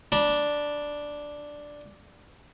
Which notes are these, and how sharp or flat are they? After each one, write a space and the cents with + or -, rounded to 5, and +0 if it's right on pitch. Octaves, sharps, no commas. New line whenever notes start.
D4 +0 B5 -40